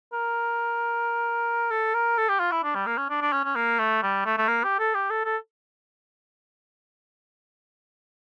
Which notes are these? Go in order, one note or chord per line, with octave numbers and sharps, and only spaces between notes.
A#4
A4
A#4
A4
G4
F4
E4
D4
G3
A#3
C#4
D4
D4
C#4
C#4
A#3
A3
G3
A3
A3
A#3
G4
A4
G4
A4
A4